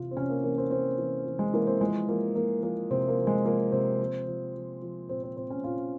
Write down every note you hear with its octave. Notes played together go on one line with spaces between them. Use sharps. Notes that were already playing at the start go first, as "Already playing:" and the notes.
Already playing: C3 E3 F4
C4
C3 C#4
A#3
E3 A#3
C4
E3 C4
E3
E3
G#3
E3 A#3
C4
F3 G#3
F3 A#3
F3 A#3
F3 A#3
C3 C4
A#3
F3
G#3
F3 A#3
C3 C4
F3
F3
F3
F3
A#2 C4
C4
A#2 C4
C#4
A#2 F4